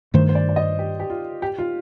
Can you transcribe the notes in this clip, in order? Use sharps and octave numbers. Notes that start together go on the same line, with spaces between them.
G2 D#3 A3 C5
C5
D5
D5
D#5
G4
G4
F4
G4
F4